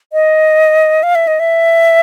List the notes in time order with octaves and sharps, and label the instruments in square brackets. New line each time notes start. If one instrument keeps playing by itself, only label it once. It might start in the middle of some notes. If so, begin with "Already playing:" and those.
[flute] D#5
F5
E5
D#5
E5